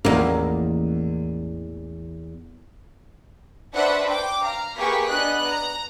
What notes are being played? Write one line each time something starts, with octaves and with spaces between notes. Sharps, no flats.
A1 E2 F3 A#3 C#4
D4 F#4 B4 C5 E5 F#5
G5 D6
F5 A#5
A#3 G4 G#4 B4 C#6 B6
B3 D4 D#5 F#6
A#5